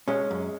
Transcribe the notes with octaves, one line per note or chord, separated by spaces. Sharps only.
G#3 C#4
F#2